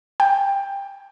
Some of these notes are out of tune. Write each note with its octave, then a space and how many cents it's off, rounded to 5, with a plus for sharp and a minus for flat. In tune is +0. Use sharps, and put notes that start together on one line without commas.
G5 +15